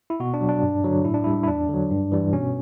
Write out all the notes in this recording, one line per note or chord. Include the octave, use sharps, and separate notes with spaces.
E4
B2 F#4
D4
F#3
D4
G2
D3 F#3
A2 E4
D4
G3 E4
E4
E2 D4
D3 F#3
G2
E3 G3
B2 C#4